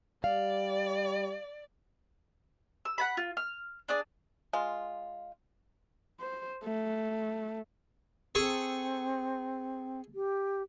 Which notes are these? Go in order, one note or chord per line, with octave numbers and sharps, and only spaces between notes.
G3 D5 F5
E6
F#5 A5 B5
F4
F6
D4 G#4 D5
G#3 F4
C5
A3
C4 G#4 A4 C#6
G4